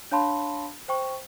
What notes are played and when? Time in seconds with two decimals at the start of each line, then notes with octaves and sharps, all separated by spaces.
0.11 D4 C#5 F5 A5 B5 C6
0.88 C5 G5 C#6